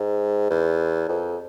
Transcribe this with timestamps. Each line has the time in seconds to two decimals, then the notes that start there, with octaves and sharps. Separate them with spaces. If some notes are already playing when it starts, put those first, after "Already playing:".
Already playing: G#2
0.50 E2
1.08 F2